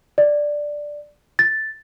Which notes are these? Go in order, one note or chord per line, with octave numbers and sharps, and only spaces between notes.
D5
A6